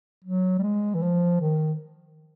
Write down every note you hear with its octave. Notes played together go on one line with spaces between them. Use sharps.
F#3
G3
G#3
E3
F3
D#3